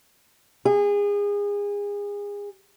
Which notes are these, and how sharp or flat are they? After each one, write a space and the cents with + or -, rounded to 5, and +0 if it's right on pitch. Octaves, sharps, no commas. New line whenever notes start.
G#4 -30